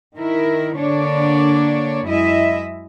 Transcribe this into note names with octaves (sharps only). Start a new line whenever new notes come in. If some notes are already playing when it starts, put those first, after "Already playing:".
D#3 E4 A#4
D3 A#3 D4 C#5 D5
F#2 G#3 E4 D#5 E5